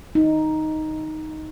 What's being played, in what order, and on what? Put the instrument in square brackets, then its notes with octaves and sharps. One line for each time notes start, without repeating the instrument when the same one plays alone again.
[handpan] D#4